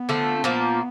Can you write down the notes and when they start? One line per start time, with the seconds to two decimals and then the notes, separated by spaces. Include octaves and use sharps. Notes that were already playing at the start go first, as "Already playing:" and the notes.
Already playing: B3
0.09 D3 F3 A3
0.37 C4
0.44 A#2 F3 A#3 B3